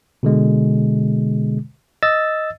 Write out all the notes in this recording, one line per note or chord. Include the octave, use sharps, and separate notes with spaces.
B2 D3 G#3
D#5 E6 A6